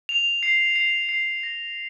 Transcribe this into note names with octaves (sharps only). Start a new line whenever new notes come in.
F7
C7
C7
C7
A#6